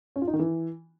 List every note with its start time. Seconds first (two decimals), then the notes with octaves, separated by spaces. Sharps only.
0.16 C#4
0.22 F4
0.28 D#4
0.33 D#3
0.39 E3